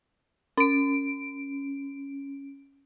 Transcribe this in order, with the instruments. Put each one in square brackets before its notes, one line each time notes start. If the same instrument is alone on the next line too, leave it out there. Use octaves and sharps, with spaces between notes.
[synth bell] C#4 D7